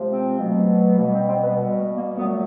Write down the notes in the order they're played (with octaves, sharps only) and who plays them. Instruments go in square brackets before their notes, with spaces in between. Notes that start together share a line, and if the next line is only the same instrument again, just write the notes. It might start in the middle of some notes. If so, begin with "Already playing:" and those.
Already playing: [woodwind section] C3 F3 G#3
C4
B2 F#3 A3
B2 G3 A#3
C4
C4
B3
B2 G3
A3
A#3
A#2 F#3 A3 B3